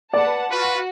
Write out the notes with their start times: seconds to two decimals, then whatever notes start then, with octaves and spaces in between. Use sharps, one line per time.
0.13 B4 D5 F#5 A5
0.51 F4 F#4 B4